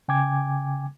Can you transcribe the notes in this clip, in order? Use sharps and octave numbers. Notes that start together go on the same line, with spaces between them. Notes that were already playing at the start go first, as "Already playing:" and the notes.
C#3 G5 G#5 D6 G#6